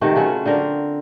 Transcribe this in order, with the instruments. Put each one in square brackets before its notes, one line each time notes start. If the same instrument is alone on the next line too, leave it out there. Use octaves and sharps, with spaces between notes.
[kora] C3 D#3 A3 F#4
C#3 F#3 C#4 F4
D3 C4 A#4